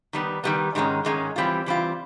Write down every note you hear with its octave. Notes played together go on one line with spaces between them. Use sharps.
D#3 G3 B3
D#3 G3 B3
G#2 D#3 G#3 C#4
G#2 D#3 G#3 C#4
E3 G3 C4 F4
E3 G3 C4 F4